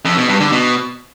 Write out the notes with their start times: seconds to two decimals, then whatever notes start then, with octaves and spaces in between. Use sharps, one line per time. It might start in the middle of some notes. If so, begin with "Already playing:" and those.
0.05 F2
0.17 B2
0.29 G2
0.40 D3
0.52 B2